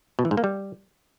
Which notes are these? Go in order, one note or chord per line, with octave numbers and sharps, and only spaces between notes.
B2
E3
G#2
A#3
G3